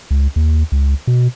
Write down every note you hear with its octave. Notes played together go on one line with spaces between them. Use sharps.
C#2
D#2
C#2
B2